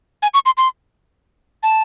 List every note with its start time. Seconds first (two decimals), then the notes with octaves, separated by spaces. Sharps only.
0.23 G#5
0.34 C#6
0.46 C6
0.57 C6
1.63 A5